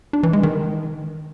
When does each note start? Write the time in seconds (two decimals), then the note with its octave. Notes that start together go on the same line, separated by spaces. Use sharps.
0.13 D4
0.23 E3
0.33 G#3
0.43 D#3